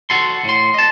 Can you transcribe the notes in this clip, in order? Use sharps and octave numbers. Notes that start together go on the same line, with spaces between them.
F#4 A4 C6
A2 C6
D#5 A5